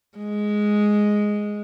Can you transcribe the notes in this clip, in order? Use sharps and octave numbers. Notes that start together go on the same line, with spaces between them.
G#3